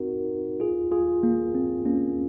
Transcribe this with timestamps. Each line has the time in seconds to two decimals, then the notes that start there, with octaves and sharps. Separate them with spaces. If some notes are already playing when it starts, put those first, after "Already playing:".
Already playing: C4 D#4 F#4 A#4
0.60 F4 G#4
0.91 F4 G#4
1.23 A#3
1.55 C4
1.86 A#3 C#4